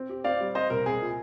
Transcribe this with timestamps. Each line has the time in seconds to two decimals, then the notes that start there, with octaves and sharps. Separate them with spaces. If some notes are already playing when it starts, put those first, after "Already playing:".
Already playing: C4
0.09 G4
0.24 C4 D5 F5
0.40 G3
0.55 C4 C5 D#5
0.70 C2 A#4
0.86 C2 G#4
1.02 A#2